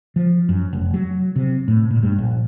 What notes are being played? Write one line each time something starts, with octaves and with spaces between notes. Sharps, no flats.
F3
F#2
F1
F#3
C3
A2
A#2
G2
A#1